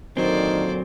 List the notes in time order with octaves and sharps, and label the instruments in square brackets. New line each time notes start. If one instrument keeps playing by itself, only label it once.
[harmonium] A#2 D3 [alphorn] D#3 [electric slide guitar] F#3 C4 [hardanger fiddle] C5 D5